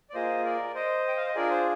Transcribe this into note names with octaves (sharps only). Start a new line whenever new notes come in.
D5
A#3 F4 G#4 C5 D#5
A#4 D5
C5 D#5
G5
F5
D#5
D4 F4 G#4 A#4 D5
C5